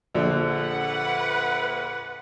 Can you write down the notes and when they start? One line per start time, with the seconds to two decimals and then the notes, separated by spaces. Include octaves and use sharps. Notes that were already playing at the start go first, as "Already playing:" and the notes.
0.15 A#1 D3 F3
0.47 B4 F#5